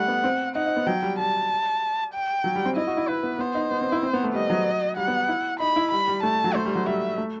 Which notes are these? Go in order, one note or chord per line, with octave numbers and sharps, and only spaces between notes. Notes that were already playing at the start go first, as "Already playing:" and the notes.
Already playing: G3 A3 F#5
B3
C4
D#4 F#5
D#4
B3
F#3 G5
G3
G3 A5
G5
F#3
G3
C4
E4 D#5
F#4
E4
E4 B4
B3
B3 C5
D#4
B3
C4
E4
C4
B3
A3
G3 D#5
F#3
G3 F#5
B3
E4
D#4 B5
E4
G3 B5
G3
A3 A5
F#3
A3 C5
G3
F#3
G3 E5
A3